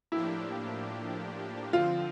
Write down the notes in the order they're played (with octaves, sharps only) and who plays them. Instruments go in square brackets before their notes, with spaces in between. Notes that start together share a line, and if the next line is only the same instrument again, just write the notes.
[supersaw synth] A2 F3 A#3 D4 G4 [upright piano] E4
[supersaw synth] D3 F3 C4 [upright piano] F4